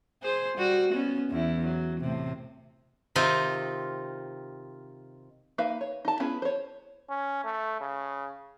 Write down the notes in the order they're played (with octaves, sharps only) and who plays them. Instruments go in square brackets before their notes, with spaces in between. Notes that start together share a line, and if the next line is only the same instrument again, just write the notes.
[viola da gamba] G#4 C5
G3 F#4
B3 C#4
E2 E4
F#3
A2 C3
[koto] C3 D#3 C4 D#4 F4
[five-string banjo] A#3 D#4 B4 E5 F5
C#5
D#4 A5
B3 C#4 E4 G#4 B4
C5 C#5
[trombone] C#4
A3
C#3